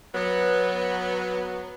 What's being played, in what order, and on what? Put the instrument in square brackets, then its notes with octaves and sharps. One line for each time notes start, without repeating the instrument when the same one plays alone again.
[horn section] F#3 B3